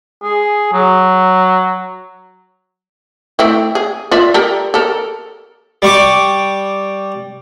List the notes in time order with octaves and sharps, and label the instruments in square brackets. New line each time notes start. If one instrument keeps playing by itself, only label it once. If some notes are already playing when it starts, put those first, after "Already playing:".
[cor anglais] G#4
F#3
[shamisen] A3 C4 E4
G#4
F4 D5 E5
G3 A4 A#4
A4 A#4
[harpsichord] G3 C#6 D6